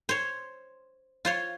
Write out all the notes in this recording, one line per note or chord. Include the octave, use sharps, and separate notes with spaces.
C5 C#5
F4 C5 C#5